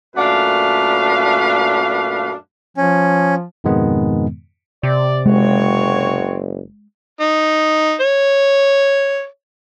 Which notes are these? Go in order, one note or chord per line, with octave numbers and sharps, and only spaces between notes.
F#2 A#2 A3 D4 B4 F5
F3 C#4
F2 G#2 B2 D#3 G#3 B3
C3 D5
F#1 G#3 C4 F#4 C#5
D#4
C#5